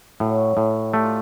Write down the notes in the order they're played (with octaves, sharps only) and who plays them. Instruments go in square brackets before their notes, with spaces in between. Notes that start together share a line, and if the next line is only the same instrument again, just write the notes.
[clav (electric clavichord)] A2 [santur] F#3 F#4
[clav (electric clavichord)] A2
[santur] G3 G4 [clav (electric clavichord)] A3
[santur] F4